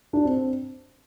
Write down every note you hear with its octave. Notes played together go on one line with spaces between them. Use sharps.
D4
C4